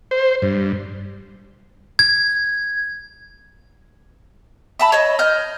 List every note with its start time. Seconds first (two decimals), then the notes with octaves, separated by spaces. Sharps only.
0.11 C5
0.42 G2
1.99 G#6
4.80 E5 A5 B5
4.92 C#5 D#5
5.19 D#5 F6 G6